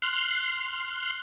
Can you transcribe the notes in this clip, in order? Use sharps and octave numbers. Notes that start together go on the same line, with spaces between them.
C6 F6 F#6